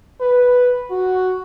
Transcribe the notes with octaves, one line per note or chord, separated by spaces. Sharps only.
B4
F#4